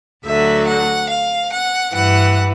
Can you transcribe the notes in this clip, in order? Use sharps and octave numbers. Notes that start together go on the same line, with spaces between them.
D2 D3 F#3 E5
F#5
F5
F#5
G2 E3 F#5